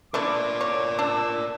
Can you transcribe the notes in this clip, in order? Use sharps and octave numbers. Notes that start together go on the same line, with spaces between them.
A3 D4 E4 A#4 D5 D6
C#5
D4 E6